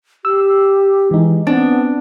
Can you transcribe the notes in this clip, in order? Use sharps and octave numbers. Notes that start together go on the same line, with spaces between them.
G4 E6
E3 G#3 D#4
B3 C4 D4